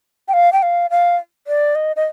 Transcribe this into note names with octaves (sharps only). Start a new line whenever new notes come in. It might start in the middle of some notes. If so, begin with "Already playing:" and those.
G5
F5
G5
F5
F5
D5
D#5
D#5